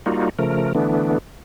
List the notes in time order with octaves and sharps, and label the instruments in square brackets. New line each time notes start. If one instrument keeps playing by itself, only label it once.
[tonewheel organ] G3 A#3 D#4 F4 F#4
C#3 F3 A3 A#4
D3 E3 A3 B3 D4